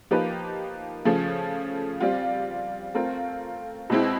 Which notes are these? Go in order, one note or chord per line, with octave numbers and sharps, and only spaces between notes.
F3 A#3 D#4 G4 B4
C#3 F3 A3
G3 C4 F4
A3 C4 F4 A#4
B2 G#3 C4 E4